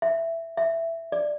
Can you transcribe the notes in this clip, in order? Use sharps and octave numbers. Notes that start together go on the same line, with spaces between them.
E5
E5
D5